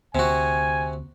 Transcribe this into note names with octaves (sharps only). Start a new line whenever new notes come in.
D2 C3 F#4 G#5